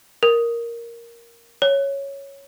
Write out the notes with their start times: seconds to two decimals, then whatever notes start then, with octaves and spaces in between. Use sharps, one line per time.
0.23 A#4
1.62 C#5